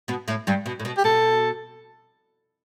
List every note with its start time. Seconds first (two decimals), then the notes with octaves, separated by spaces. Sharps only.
0.08 B2 B3
0.28 A2 A3
0.47 G2 G3
0.66 B2
0.80 A2
0.85 B2
0.98 G4
1.04 B2 A4